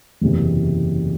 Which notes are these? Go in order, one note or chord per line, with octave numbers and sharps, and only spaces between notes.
F#1 E2 C3 E3